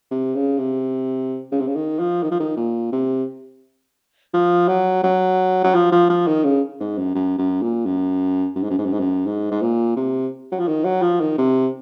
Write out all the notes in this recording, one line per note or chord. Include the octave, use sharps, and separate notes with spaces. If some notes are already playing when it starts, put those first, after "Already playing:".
C3
C#3
C3
C#3
C3
C#3
D#3
F3
D#3
F3
D#3
A#2
C3
F3
F#3
F#3
F#3
F3
F3
F3
D#3
C#3
G#2
F#2
F#2
F#2
A#2
F#2
F#2
G#2
F#2
G#2
F#2
G#2
F#2
G#2
G#2
A#2
C3
F#3
F3
D#3
F#3
F3
D#3
C3